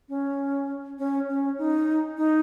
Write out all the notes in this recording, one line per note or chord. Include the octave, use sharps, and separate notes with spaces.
C#4
C#4
C#4
D#4
D#4